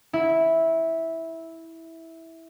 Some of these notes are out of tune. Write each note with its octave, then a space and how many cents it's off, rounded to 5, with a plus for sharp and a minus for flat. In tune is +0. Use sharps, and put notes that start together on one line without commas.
E4 -10